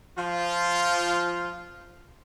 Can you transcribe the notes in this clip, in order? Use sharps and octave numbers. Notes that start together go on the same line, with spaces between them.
F3 F4